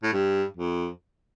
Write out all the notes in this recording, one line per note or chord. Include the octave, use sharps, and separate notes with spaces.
A2
G2
F2